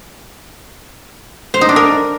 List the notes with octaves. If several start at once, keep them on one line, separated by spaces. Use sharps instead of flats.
C5
D#4
D4
A#4